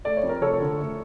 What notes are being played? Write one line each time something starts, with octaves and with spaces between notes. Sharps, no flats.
A3 D5
C#5
F2
A#4
F1 A4 C#5
D3
A3